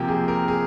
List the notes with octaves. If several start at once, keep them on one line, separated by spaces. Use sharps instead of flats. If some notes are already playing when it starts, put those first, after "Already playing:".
Already playing: C3 F3 A#3 G4
G#4
A#4
G#4